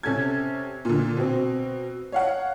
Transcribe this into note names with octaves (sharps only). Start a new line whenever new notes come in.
C3 C#4 A4 G#6
A#2 D3
B2 C4
C#5 F5 F#5